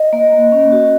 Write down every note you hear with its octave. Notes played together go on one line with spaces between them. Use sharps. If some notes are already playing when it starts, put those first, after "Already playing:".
Already playing: D#5
A#3
A#3
C#4
F#4